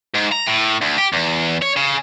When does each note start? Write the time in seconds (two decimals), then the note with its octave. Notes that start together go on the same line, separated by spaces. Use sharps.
0.15 G#2
0.32 A#5
0.47 A2
0.82 D2
0.98 G4
1.13 E2
1.62 C#5
1.76 C#3